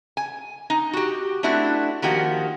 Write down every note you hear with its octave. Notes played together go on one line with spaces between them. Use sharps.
G#5
D#4
F#4 G4
A3 C4 D4 E4 F#4
D#3 F3 A#3 F#4 G4